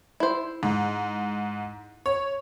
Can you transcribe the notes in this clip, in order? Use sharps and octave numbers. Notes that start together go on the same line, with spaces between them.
E4 C5
G#2
C#5